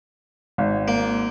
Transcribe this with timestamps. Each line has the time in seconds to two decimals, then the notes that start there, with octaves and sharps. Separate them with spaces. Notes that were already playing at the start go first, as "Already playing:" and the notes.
0.58 G#1
0.88 A#3